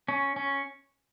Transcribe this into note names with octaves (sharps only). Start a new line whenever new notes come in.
C#4
C#4